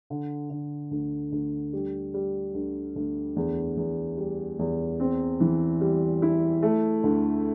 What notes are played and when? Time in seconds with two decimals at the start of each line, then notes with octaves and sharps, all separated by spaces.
0.10 D3
0.50 D3
0.91 D2
1.32 D2
1.73 G3
2.14 G3
2.54 D2
2.96 D2
3.36 E2
3.77 E2
4.17 G3
4.59 E2
5.00 C4
5.40 E3
5.81 G3
6.22 E4
6.63 A3
7.04 D2